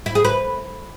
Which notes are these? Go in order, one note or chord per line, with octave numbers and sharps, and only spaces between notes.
E4
G#4
B4